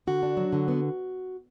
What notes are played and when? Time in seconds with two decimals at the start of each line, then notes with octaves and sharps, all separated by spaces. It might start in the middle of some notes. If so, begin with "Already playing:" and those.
0.07 D3 F#4
0.23 D4
0.37 F#3
0.53 D3
0.68 B3